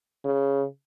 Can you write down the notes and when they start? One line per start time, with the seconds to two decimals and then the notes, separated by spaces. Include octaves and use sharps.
0.25 C#3